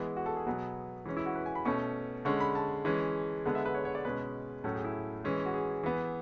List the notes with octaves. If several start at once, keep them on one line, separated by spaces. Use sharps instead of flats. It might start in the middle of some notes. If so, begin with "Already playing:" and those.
Already playing: E3 G#3 B3 E4
F#4
A4
G#4
B2 F#3 B3
E3 G#3 C#4
E4
F#4
B4
G#5
B5
B2 A3 C#4 C#6
D3 G#3 C#4 C#6
B5
A5
E3 G#3 C#4
D3 G#3 B3
E5
B4
C#5
C#5
D5
B2 G#3 C#4 B4
A2 F#3 A3 C#4 A4
G#4
E4
E3 G#3 C#4
F#4
G#4
E3 B3